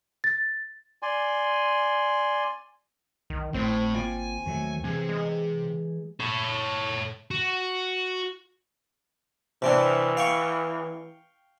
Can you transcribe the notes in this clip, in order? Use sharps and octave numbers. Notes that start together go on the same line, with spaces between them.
A6
D5 G#5 C6
B1 D#3
G#1 A2 C4 C5
A#3 F4 G5 G#5
D#2 D#3 F#3 A3
C3 E3 G#4 G#5
G#3
A4 C#5
F#4
C3 E3 C4 D4
F5 G5 C#6